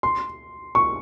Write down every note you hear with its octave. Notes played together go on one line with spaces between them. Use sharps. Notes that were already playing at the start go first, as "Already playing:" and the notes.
C6
C#6